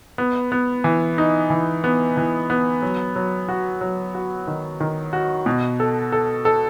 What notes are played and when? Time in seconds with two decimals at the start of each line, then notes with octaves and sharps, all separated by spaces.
0.18 B3
0.52 B3
0.84 E3
1.18 D#4
1.50 E3
1.84 B3
2.17 E3
2.50 B3
2.82 F#3
3.16 F#3
3.48 F#4
3.81 F#3
4.15 F#4
4.47 D#3
4.80 D#3
5.13 F#4
5.46 B2
5.80 A4
6.12 A4
6.45 A4